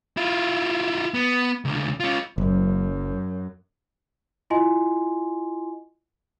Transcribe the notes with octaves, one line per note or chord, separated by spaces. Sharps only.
E4 F4
B3
C#2 D3
C#4 F4
F#1 F#2
E4 F4 D#5 G#5 C6